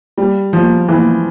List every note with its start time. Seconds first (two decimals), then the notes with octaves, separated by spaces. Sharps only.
0.18 G3
0.53 F3
0.88 E3